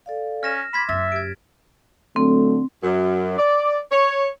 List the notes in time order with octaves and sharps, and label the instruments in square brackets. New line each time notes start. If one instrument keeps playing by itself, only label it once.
[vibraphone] A4 D5 F5
[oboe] C#4 [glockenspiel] F6 A#6 E7
[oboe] B5 [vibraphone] C6 D6 [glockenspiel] G#6 B6 E7
[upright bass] F#1 F#2 [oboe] E5 [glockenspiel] A6
[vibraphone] G4 [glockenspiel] G#6 D7
[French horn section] D3 F#3 A3 [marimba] C4
[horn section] F#2
D5
C#5